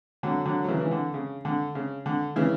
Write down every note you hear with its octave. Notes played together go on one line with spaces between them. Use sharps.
D3 F#3
D3 F#3
F#3
C#3 E3
E3
D3
C#3
D3
C#3
D3
C#3 E3